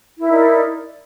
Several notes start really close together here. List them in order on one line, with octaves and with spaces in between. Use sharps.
E4 A#4 D#4 D5